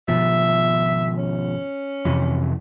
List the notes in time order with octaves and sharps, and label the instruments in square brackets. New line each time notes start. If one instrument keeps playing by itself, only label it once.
[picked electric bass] G#1 B2 F3 [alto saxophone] E5
[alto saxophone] C#4
[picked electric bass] F2 C3 E3